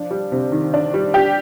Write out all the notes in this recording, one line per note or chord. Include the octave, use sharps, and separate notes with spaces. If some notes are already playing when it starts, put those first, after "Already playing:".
Already playing: F3 D4
G3
C3
D#3
D4
G3
G4